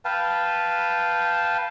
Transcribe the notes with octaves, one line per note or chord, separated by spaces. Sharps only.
B4 F5 G5 A5